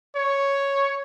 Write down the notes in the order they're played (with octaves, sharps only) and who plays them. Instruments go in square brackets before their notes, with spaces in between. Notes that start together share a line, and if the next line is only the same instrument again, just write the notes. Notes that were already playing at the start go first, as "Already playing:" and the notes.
[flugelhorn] C#5